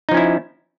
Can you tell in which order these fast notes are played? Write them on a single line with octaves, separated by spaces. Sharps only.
D#4 F3 C#4 E4